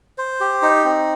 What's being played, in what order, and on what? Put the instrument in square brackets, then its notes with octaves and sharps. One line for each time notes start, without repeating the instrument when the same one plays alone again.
[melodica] C5
G4
D#4
C4